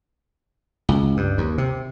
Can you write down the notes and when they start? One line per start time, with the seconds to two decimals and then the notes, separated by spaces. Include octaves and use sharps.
0.89 C#2
1.17 G2
1.38 D#2
1.58 C3